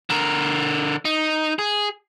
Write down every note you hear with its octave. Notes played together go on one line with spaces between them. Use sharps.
D3 A#4
D#4
G#4